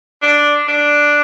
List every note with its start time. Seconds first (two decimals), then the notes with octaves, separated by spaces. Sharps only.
0.22 D4
0.68 D4